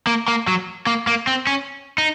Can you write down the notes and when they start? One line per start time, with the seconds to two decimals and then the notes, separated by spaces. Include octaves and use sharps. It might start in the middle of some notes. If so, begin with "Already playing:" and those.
0.07 A#3
0.28 A#3
0.48 F#3
0.87 A#3
1.07 A#3
1.27 C4
1.47 C#4
1.98 D#4